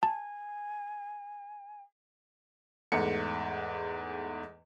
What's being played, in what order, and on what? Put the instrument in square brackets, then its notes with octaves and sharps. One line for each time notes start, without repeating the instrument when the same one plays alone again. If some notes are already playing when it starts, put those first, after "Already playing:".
[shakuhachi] G#5 [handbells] A5
[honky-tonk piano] E2 G#2 A3 C#7